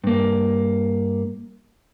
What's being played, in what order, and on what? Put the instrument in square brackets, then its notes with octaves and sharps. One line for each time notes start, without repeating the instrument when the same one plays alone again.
[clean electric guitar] G2 A#3